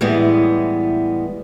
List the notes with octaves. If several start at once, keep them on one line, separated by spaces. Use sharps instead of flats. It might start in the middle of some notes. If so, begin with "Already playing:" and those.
A2 E3 G3 G#3 B3